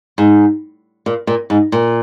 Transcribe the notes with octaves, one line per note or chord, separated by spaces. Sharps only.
G#2
A#2
A#2
G#2
A#2